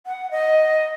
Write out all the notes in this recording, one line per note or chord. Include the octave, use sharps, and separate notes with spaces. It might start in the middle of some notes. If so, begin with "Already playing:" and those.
F#5
D#5